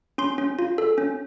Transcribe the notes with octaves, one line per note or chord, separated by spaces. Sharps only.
C#4 C6
C#4
F4
A4
C#4